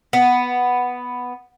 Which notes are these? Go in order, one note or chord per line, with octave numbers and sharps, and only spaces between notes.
B3